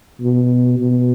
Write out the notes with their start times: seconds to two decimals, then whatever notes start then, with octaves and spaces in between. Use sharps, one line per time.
0.22 B2
0.80 B2